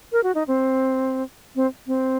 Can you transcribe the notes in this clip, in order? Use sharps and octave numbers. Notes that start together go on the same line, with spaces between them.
A#4
F#4
D#4
C4
C4
C4